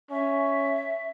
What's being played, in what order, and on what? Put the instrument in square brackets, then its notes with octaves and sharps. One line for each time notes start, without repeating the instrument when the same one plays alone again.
[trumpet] C#4 [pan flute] E5